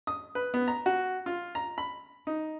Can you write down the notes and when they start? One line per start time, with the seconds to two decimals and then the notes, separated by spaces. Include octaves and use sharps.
0.07 D#6
0.35 B4
0.54 B3
0.68 A#5
0.86 F#4
1.26 F4
1.55 A#5
1.78 B5
2.27 D#4